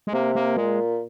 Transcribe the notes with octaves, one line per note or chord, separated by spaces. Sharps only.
G#3
C3 A#3
A#3
A#2 G#3